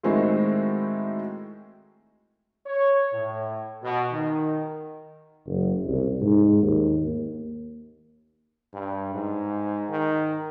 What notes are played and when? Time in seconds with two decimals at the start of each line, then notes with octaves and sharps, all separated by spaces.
0.03 A2 D#3 G#3 C4 E4 F#4
2.67 C#5
3.13 A2
3.83 B2
4.12 D#3
5.47 F#1
5.86 C2
6.22 G#2
6.62 D#2
7.08 A#3
8.74 G2
9.14 G#2
9.90 D#3